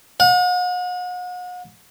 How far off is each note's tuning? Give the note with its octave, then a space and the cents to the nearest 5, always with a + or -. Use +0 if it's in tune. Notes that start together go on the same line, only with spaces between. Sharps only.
F#5 -40